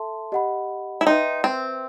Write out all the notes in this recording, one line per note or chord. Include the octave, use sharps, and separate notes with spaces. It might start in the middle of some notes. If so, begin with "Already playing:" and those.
Already playing: A4 E5 A5 C6
G4 D#5 F#5 B5
E4
D#4 B4 E5 G5 C6
C4